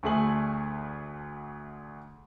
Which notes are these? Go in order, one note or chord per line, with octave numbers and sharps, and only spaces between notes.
D2 D3 A3 G#4 G#5 F#7